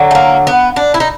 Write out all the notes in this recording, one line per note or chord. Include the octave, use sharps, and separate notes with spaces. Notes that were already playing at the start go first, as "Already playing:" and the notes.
Already playing: D3 F#3
A3
A#3
B3
D4
E4
D#4